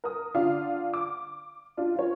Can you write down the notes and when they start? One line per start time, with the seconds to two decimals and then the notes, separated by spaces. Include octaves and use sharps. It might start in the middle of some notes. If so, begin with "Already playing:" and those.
0.04 A#4 D#6
0.34 D3 F4 D5 F5
0.94 D6
1.77 D4 F4
1.95 F4 C#5